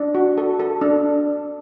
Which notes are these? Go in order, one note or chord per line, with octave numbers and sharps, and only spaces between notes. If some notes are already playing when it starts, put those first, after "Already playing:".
Already playing: D4
F#4
A4
A4
D4